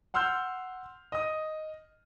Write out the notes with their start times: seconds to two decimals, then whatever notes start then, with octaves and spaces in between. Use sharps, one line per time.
0.14 F#5 C6 E6 F6 G6
1.12 D#5 D#6